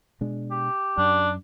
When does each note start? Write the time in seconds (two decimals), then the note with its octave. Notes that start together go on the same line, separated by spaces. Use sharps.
0.21 B2 G#3 D4
0.51 G4
0.98 F#2 D4